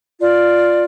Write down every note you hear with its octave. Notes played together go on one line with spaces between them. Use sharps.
F4 D5